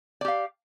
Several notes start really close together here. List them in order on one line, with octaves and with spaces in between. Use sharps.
D5 G4 F5